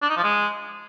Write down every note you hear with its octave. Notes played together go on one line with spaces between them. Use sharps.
D4
D#4
F3
G#3